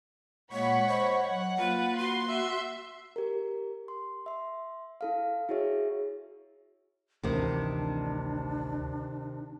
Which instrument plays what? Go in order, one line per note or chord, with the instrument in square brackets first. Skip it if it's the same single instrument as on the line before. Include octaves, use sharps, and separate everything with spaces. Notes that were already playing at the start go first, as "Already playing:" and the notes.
[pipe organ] A#2 G#3 A#3 [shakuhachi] C#5 [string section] F#5 B5 C#6
[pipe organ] C5 D#5 [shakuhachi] C#5
[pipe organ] F#3 [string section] F#5
[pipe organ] A#3 [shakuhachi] F4 [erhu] B4
[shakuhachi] F#4 [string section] C6
[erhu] E5
[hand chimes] G4 A#4
C6
E5 C6
E4 A4 F5
E4 F#4 G#4 C#5 E5
[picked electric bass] A1 D2 E3 [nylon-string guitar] C3 D#3 [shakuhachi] D4